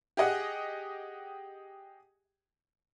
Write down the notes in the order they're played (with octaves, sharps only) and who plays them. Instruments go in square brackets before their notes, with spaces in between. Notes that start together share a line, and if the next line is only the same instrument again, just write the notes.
[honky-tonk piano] G4 G#4 D#5 F#5